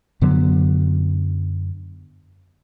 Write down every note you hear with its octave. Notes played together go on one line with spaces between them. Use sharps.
F#2 D3 F#3 B3